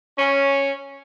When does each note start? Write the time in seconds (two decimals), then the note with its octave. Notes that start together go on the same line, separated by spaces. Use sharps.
0.18 C#4